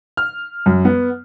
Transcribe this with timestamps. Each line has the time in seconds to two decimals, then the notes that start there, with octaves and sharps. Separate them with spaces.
0.17 F6
0.66 F#2
0.85 B3